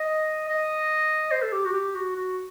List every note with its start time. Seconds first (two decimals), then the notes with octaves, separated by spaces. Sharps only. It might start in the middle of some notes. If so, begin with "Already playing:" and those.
Already playing: D#5
0.48 D#5
1.31 C5
1.42 A4
1.53 G4
1.65 F#4
1.73 G4
1.95 F#4
2.15 F#4